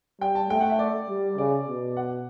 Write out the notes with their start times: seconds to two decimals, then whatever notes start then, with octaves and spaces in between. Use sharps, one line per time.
0.21 G3 G5
0.35 A5
0.50 A3 G5
0.60 F#5
0.70 E5
0.79 D5
1.09 G3
1.38 C#3 D5
1.68 B2
1.97 F#5